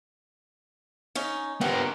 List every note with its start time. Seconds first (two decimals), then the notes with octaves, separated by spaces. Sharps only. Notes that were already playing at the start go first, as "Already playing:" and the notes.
1.15 C#4 D#4
1.61 G2 B3 G4 A#4 F#5